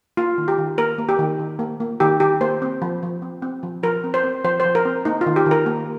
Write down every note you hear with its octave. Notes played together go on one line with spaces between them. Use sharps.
A#3 F4
D#3
G4
D#3
A#3 A#4
A#3
G4
D#3
D#3
A#3
A#3
D#3 G4
D#3 G4
A#3 C5
C4
F3
F3
C4
C4
F3
F3 A#4
C4
C5
C4
F3 C5
C5
F3
A#4
C4
A#3 D#4
F4
D#3
G4
D#3
A#4
A#3